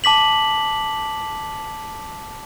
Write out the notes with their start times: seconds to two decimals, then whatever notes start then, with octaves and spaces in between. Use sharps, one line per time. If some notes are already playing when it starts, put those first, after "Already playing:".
0.04 A5 D6 B6 F#7